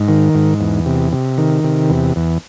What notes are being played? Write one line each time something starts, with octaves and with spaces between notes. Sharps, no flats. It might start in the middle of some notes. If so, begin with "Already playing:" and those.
Already playing: G#2
D#3
G#2
E2
C3
C3
D#3
C3
E2
E2